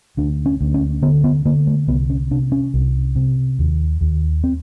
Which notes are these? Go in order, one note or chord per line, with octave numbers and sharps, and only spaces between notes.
D2 D4
C#4
D2
C#4
D3 B3
B3
D3 A#3
A3
C2 B3
C#4
C3 D4
C#4
C2
C3
D#2
D#2
C4